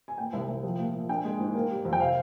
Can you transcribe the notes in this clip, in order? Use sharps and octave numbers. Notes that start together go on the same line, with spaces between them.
G#5
A#2 G5
C2
C2
F3
A#2
A#2
D4 G5
G#3
G#2
A#3
G3
F2
G5
C3 F5